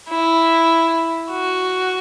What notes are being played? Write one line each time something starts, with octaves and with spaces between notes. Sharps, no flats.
E4
F#4